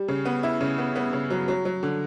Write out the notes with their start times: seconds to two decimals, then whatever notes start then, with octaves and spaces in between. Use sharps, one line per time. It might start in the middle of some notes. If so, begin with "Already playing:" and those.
Already playing: G3
0.08 C#3
0.25 B3
0.43 E4
0.61 C#3
0.78 B3
0.96 B3
1.13 C#3
1.30 F#3
1.48 F#3
1.65 F#3
1.83 D3